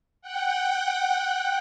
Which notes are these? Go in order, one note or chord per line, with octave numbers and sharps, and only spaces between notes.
F#5 G5 F#6